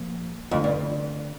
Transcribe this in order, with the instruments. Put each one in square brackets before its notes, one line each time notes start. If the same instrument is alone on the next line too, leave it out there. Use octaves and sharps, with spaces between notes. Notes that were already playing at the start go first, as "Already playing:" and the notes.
Already playing: [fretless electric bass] A#2 F3 A#3
[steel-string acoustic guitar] F2 [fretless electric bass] D3 A3 C4
[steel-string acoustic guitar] G2